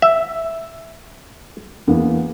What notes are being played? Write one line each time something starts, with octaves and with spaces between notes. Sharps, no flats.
E5
E2 A#3 B3